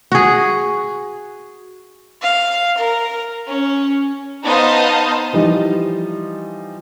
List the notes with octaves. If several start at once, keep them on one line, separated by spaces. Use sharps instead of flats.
F#4 G#4
F5
A#4
C#4
B3 D#4 C5 D#5 F5 A5
E3 F3 G3 D#4